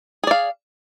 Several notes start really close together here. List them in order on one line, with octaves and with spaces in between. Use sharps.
G#4 D5 F5